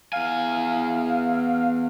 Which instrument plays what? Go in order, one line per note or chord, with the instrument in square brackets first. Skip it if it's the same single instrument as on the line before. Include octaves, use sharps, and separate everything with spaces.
[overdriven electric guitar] E2 G#5 [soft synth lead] F5